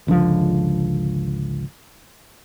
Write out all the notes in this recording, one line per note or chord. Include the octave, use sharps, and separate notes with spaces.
G#1 C#2 D3 F3